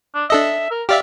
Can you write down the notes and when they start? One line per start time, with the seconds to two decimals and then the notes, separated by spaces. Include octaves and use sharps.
0.15 D4
0.30 D4 A4 D#5 E5
0.71 A#4
0.89 G4 D5 E5 F5